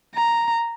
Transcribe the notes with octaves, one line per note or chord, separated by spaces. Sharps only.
A#5